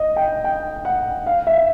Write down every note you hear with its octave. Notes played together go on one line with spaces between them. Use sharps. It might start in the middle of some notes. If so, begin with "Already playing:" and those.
Already playing: D#5
G5
G5
F#5
F5
E5